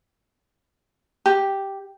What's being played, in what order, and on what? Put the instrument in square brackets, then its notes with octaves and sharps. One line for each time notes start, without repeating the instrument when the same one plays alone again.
[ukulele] G4